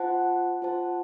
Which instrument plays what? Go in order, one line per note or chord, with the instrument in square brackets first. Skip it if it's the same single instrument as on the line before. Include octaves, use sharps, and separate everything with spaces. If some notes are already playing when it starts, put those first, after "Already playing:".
Already playing: [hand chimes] F4 C5 F#5 A5
F4 C5 F#5 A5